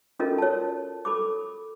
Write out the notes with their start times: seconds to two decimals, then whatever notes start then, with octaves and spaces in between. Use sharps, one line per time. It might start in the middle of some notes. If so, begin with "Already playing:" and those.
0.19 C#4 F4 F#4 A4 A#4 D#5
0.38 C#5 A5
1.05 A4 B5 D6